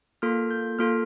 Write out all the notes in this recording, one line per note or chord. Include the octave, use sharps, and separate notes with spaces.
A#3 F4 A4 F6
G6
A#3 F4 A4 F6